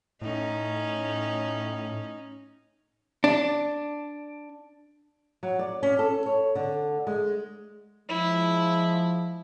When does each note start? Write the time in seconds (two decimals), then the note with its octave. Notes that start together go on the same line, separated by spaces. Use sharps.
0.21 A2 C#4 D#4
3.24 D4
5.43 F#3
5.59 D5
5.83 C#4
5.99 A4
6.26 C#5
6.55 D3
7.07 G#3
8.09 F3 G#3 E4